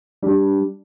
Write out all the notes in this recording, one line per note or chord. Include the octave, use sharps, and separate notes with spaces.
G3 D4 G4